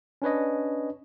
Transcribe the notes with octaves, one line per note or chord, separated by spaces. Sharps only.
C#4 D4 B4 C#5 D#5